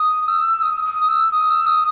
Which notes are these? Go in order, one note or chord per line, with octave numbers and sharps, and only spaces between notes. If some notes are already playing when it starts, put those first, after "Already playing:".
Already playing: D#6
E6
D#6
D#6
E6
D#6
E6
D#6